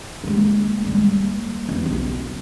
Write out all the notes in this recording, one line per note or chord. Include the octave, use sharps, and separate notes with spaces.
G#3 A#3
G3 G#3
A#3
E2
B1